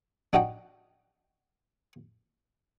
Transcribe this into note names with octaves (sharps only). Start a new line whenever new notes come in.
D4 D#4 F#4 D#5 F#5 G5